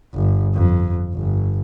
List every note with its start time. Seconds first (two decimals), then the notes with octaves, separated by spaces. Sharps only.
0.14 G1
0.54 F2
1.14 G1